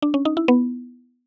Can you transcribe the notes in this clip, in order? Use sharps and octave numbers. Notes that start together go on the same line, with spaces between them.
D4
C#4
D#4
E4
B3